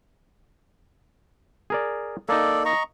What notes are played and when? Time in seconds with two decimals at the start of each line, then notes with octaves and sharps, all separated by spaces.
1.70 G#4 A#4 D5
2.29 A#3 D#4 A4 D5
2.65 D#5 A#5 C#6